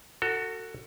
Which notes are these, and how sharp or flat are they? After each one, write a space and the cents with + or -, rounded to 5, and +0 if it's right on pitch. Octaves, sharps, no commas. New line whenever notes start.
F#4 +0 A4 +35